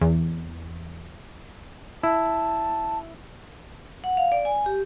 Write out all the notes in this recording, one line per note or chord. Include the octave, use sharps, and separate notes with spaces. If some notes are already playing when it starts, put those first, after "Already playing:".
E2
E4 A5
F#5
F5
D5
G#5
G4